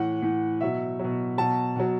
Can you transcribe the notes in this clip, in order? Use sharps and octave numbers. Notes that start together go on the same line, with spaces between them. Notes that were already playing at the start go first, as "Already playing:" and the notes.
Already playing: A2 E3 F#5
A2 E3
B2 F#3 E5
B2 F#3
B2 F#3 A5
B2 F#3